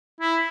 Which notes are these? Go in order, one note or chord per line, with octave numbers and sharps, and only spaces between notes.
E4